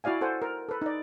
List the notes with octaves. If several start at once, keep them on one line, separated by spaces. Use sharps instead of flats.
E4 F#4 D5 F5 G#5
A4 C5 F#5 G#5
A#4
A4 B4
D#4 D5